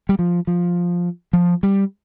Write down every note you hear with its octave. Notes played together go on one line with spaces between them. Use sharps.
G3
F3
F3
F3
G3